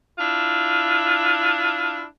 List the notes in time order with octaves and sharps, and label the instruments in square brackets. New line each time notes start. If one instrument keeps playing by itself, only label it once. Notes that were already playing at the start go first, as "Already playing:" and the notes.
[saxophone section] D4 E4 F4